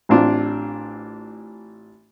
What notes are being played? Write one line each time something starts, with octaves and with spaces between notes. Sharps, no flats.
A1 A2 C4 D4 F4